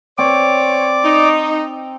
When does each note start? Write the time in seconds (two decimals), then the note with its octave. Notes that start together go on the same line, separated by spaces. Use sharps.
0.18 C4 C#5 D5 D6
1.04 D#4